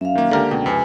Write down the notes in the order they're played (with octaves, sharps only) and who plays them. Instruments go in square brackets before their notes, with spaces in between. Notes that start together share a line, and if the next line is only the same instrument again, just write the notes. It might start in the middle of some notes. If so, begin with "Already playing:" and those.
[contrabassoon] F#2 [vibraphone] E5 F5
[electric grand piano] D#3 A#3
[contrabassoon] C#2 [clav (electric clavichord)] D3 A#4 [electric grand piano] A#3 G4
[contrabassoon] C#2 [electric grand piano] B2 [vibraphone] G5
[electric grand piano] F2 C3 [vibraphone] B4 G#5